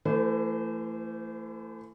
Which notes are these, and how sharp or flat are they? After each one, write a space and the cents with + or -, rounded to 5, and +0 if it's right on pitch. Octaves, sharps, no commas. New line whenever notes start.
E3 +25 A3 +25 C5 -25